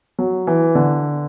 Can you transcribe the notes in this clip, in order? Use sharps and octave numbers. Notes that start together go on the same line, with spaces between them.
F#3
E3
D3